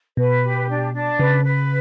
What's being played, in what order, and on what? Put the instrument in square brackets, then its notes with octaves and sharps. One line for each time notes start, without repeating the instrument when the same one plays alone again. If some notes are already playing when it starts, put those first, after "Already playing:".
[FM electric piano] B2 [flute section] B4
[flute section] G4
D4
D4
[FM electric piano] C#3 [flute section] B4
[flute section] B4